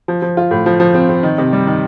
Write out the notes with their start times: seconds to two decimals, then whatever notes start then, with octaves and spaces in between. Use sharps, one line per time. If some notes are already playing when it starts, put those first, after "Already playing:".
0.08 F3
0.22 F3
0.37 F4
0.51 A2
0.66 F3
0.80 F3
0.94 C4
1.09 C4
1.23 D#3
1.38 C3
1.53 G3
1.67 D#3